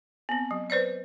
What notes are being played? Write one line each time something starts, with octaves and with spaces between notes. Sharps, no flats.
B3 C4
F#3
B4 C5 D5 D#5